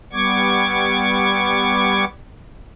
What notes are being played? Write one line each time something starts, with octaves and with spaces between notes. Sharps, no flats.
G3 B3 C#6 D6 G#6